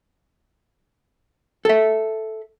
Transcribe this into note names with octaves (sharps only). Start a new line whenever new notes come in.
A4 E5